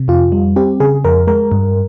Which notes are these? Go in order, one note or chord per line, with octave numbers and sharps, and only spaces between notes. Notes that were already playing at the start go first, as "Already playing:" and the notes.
Already playing: C3
F2 F4
G3
C4 G4
C#3 G#4
F2 A#4
G#3 A#4
G2